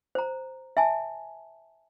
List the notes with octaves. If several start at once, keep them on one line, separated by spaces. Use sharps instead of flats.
C5 A#5
E5 G#5 A5